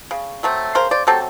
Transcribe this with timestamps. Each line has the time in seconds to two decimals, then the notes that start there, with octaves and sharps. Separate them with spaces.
0.11 C#3
0.43 F#3 A3 C4
0.75 C#3 A#4 C5
0.91 C5 D5
1.07 F#3 A3 C4 G4 A4